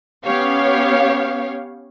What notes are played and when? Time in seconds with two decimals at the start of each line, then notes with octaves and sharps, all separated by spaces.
0.25 B3 C#4 G4 C#5 F5